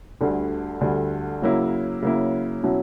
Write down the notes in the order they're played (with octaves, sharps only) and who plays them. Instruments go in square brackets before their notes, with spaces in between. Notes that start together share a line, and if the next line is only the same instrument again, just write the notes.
[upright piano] D2 D3 G3
D2 D3 G3
C#3 F#3 A#3 E4
C#3 F#3 A#3 E4
B2 F#3 C#4 E4